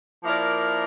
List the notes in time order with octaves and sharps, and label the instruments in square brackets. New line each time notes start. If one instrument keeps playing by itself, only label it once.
[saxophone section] F3 A#3 E4 A#4 D5